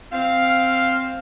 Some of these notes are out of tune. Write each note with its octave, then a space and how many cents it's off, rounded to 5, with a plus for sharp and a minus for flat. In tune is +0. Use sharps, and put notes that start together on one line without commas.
C4 +0 F5 +0